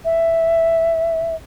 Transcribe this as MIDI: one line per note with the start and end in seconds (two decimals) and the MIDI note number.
0.05 1.35 76